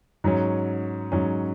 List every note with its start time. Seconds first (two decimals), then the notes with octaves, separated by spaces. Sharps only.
0.24 G#2 F#3 C#4
1.12 G#2 F#3 C#4